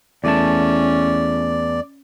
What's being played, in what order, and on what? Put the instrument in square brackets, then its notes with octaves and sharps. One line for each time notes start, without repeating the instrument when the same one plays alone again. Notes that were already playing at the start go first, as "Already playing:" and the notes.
[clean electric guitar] E2 A3 A5 [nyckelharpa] C#4 [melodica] D5